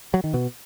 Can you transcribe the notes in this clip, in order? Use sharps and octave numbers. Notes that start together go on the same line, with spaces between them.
F#3
D#3
B2